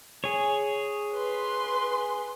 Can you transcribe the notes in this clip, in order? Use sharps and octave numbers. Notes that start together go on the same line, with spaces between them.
G#4 C#5
B4 C6